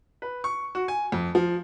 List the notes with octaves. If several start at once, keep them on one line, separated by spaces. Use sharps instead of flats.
B4
C#6
F#4
G#5
F2
F3